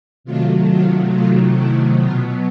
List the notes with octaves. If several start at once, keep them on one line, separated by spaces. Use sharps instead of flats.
C3 D#3 F#3 A3 F4
F4
F4
E4
B2 F#3 B3 F4